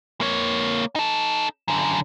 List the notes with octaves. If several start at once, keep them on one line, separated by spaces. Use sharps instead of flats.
A#3 C#5
D#4 A4
F#2 D3